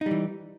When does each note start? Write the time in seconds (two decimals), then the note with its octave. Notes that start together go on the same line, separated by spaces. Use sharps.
0.01 D#4
0.06 G3
0.11 E3